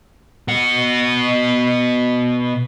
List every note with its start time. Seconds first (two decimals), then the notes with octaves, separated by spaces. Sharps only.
0.48 B2 F#5